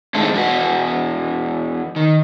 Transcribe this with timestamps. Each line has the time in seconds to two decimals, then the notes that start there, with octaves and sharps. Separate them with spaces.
0.14 A2 G#3 A3 C4 D4 D#4
0.34 E2 F#4 B4
1.96 D#3